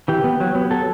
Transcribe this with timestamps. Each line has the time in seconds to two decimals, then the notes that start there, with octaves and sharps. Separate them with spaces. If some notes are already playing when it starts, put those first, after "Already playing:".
0.08 E3 G4
0.24 B3
0.40 F#3
0.55 B3
0.71 F#3 A4